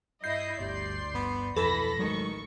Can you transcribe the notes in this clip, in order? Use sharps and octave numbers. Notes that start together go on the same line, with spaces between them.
G2 E4 D#5 G6 C7
G1 D2 G3 D5 C6
G1 B3
B1 F2 E3 A4 B5 A#6
A1 D#3 F#3 G#3 C#6